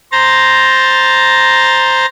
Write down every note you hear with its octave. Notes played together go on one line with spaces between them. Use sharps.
C5 A#5 A6